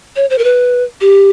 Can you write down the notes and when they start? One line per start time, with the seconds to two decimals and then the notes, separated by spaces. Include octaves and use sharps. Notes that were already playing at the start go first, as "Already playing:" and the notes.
0.16 C#5
0.30 C5
0.38 A#4
0.44 B4
1.01 G4